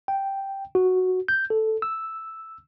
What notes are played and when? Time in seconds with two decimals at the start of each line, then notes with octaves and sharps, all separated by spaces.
0.08 G5
0.75 F#4
1.28 G6
1.50 A4
1.82 E6